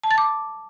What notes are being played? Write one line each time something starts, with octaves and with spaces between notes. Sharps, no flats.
A5
A6
D6